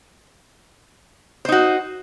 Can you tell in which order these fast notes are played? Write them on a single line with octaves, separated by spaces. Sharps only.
C5 D#4 F#4